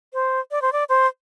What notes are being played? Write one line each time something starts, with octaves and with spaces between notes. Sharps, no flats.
C5
D5
C5
D5
C5